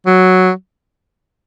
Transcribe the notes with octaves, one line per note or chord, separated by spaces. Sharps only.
F#3